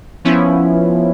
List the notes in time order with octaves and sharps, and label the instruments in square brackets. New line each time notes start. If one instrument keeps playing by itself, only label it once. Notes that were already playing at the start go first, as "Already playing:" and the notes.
[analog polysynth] F3 B3 C#4 E4